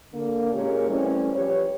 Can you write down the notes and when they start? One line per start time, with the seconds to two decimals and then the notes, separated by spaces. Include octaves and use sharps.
0.13 D3 A#3
0.53 A#2 G#3 C#4 G4 A#4 C#5
0.89 E3 G3 A3 C4 C#4
1.35 F3 G4 B4 C#5